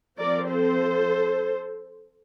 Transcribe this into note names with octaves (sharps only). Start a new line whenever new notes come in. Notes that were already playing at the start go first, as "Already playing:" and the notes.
F3 C4 A#4 D5
A4 C5